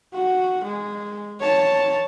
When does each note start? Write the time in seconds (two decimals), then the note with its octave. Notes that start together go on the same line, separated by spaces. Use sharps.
0.14 F#4
0.64 G#3
1.40 C#5 A5